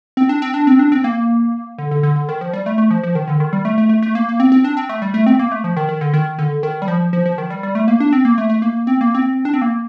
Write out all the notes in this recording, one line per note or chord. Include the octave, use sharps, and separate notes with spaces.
C4
D4
C4
D4
C4
D4
C4
A#3
D3
D3
D3
D3
D#3
F3
G3
A3
A3
F3
F3
D#3
D3
D#3
G3
A3
A3
A3
A3
A#3
A#3
C4
C4
D4
C4
A3
G3
A3
C4
A#3
A3
F3
D#3
D#3
D3
D#3
D3
D#3
G3
F3
F3
F3
D#3
G3
G3
A3
A#3
D4
C4
A#3
A3
A3
A#3
C4
A#3
C4
D4
C4
A#3